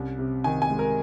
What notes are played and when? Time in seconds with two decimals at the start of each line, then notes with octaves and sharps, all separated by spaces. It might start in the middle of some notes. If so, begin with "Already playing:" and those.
Already playing: C2 C#4
0.19 C3
0.44 D#3 G#5
0.62 G#5
0.70 G#3
0.79 A#4